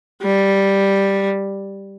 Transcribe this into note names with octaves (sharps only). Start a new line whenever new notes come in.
G3